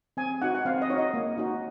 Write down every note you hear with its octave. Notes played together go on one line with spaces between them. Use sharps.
C4 G#5
D#4 F#4 F#5
F#5
C4 F5
D#5
D#4 F#4 C#5 D#5
A#3
D#4 F#4